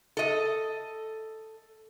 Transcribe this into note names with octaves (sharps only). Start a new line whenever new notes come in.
A4 D#5